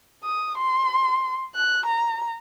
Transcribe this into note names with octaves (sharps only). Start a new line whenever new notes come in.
D#6
C6
F#6
A#5